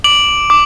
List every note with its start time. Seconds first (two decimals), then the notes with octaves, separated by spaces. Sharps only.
0.04 D6 D7 F#7
0.50 D6